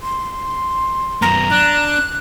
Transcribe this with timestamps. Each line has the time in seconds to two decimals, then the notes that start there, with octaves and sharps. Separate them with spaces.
0.02 C6
1.22 F#2 B3 A#5
1.51 D4 F#6